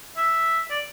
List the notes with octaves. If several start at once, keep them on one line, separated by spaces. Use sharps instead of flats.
E5
D5